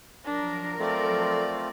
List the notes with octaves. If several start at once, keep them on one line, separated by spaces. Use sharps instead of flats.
F3 F#3 D4 A#4
A3 C4 F4 A4 D5